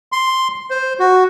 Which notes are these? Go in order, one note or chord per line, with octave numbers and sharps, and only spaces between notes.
C6
C5
F#4